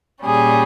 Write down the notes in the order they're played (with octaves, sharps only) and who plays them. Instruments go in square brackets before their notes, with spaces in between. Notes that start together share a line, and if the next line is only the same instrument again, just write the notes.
[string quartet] A#2 G3 C#4 G#4